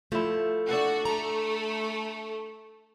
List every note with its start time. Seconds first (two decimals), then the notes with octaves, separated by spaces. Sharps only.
0.12 F3 A3 E4
0.68 D4 F#4 A4 F#5
1.05 A3 A#5